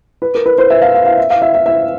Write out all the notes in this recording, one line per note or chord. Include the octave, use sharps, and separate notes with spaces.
B4
A#4
B4
C5
E5
F5
F5
F5
E5
F5
E5
E5
E5